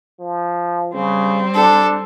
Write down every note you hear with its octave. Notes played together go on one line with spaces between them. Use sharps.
F3
C#3 G3 C4
D4 A4